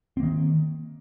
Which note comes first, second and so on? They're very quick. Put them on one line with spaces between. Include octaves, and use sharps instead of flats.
C4 A#3 D#3